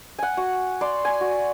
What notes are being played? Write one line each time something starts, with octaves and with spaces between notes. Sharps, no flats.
F#5 G#5
F#4
D5 C6
G#5
F#4